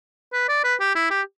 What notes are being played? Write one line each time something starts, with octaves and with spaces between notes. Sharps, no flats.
B4
D5
B4
G4
E4
G4